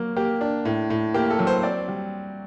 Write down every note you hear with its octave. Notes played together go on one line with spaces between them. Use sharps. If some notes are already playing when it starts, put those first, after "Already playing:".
Already playing: F#3 A#3
A#3 G4
D4
A2
A2
A#3 G4
A4
F#3
C5
C4 D5
G3